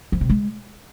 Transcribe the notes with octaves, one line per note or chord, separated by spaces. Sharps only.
F3
C3
G#3